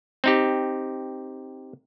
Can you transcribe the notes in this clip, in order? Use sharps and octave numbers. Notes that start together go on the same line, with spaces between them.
C4 D#4 G4